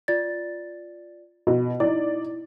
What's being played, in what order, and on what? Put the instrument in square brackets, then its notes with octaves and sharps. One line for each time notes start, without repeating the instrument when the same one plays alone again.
[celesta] F4 D5 A6
[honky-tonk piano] B2
[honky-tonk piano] D#4 D5 [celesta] E4